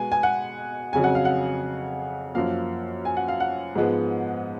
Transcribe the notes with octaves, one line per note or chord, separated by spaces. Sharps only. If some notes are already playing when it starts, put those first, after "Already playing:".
Already playing: B2 G#3 B3 G#5
G#5
F#5
F2 C#3 F#3 G#5
F#5
F5
F#5
F#2 F3 A#3 F5
G#5
F#5
F5
F#5
G#2 F3 G#3 B3